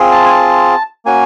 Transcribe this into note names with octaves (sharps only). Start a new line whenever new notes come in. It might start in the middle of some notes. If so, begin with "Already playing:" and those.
Already playing: C4 F4 G#4
A5
G#5
A5
A#3 C#4 F#4 G#5